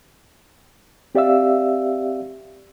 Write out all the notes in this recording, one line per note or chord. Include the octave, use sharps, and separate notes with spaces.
C4 G4 D5 E5 F5 E6